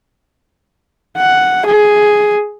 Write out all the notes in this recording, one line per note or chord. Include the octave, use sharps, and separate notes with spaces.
F#5
G#4